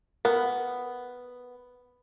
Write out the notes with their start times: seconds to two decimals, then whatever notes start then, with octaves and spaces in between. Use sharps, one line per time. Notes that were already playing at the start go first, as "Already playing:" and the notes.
0.25 B3 A#4